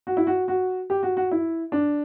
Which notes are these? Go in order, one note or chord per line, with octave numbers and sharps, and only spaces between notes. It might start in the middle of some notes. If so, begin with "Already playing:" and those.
F#4
E4
F#4
F#4
G4
F#4
F#4
E4
D4